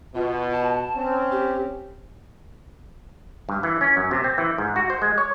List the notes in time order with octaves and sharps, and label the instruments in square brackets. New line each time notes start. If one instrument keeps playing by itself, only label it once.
[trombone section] B2 [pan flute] F4
[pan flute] A5
[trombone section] C4 C#4
[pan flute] G4
[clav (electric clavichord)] G2
E3
C#4
F#2
C3
C4
E3
G#2
F#4
C5
G#3
C#5